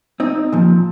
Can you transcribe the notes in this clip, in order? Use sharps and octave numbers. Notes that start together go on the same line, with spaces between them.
C4 D#4
A#2 F3